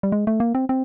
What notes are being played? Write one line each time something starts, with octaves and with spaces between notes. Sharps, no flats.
G3
G#3
A3
A#3
C4
C4